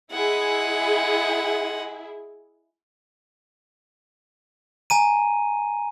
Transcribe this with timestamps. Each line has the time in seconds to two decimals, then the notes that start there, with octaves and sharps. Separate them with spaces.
0.12 G#3 E4 G#4 F#5
4.90 G#5 A#5 D#7